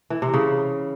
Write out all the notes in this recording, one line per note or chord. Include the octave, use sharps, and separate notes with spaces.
E3
C3
C#3